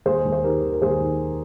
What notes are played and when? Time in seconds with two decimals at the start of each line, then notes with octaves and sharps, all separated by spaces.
0.06 D#2 G#4 C5
0.25 D#2
0.32 C5
0.44 D#3 G4 A#4
0.62 D#3
0.72 A#4
0.82 D#2 G#4 C5
1.01 D#3